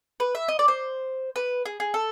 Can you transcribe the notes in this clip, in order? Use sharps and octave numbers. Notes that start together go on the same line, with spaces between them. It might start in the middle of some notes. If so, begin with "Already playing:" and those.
B4
E5
D#5
D5
C5
B4
G#4
G#4
A4